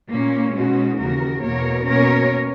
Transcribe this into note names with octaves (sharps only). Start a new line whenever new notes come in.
A#2 A#3 C#4
B2 G#3 C#4 D#4 F#4
D#2 C#3 E3 A#3 F#4 A#4
E2 B2 A#3 A#4 C#5
B2 A#3 C#4 A#4 C#5